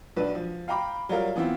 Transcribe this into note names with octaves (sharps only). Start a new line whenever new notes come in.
B1 D4 B4
F3
F5 G5 A#5 B5 D6
F#3 G3 F4 A#4 F5
E3 B3 C4 E4 F4